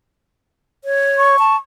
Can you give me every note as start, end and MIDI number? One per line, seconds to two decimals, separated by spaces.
0.84 1.39 73
1.18 1.53 85
1.39 1.56 81